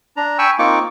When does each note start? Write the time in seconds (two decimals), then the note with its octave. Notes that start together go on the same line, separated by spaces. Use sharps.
0.17 D4 A#5
0.39 G5 G#5 B5 C#6 E6
0.59 A#3 C4 D#4 F4 C#6 D6